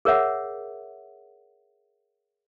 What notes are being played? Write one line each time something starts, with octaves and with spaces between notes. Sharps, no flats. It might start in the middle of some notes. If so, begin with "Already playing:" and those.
G#4 A#4 C#5 E5 F#5